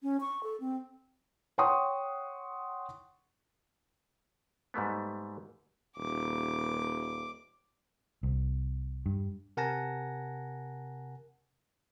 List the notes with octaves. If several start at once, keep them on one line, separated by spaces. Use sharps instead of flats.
C#4
C#6
A4
C4
C#5 F#5 G5 C6 C#6 D#6
G#2 G3 A3 B3
D#1 D6
C2
G2
C3 A#4 F#5 G#5 A5 A#6